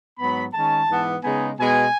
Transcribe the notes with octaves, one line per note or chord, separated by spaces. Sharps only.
G#2 F#3 B3 B5
D#3 G#3 C#4 A5
G#2 E3 B3
C#3 G#3 B3 D#4 G#5
B2 G#3 B3 G#5